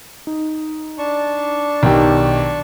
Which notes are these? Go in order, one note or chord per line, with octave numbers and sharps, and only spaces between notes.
D#4
D4 A5 C#6
B1 D#3 G4